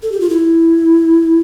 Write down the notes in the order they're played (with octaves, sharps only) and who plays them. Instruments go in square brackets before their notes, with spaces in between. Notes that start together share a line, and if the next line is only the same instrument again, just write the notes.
[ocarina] A4
G4
F4
E4